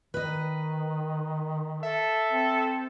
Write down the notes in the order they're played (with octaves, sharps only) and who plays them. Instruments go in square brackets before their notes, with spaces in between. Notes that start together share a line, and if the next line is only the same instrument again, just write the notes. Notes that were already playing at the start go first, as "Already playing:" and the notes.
[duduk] D#3 [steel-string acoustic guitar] B4 D#5
[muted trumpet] A4 [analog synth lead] E5
[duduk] C4